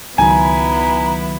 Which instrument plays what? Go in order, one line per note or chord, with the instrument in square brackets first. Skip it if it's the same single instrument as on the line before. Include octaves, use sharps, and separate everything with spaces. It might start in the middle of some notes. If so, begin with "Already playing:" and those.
[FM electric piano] C#2 D#3 F#3 [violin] B3 E4 [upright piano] G#5 [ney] A#5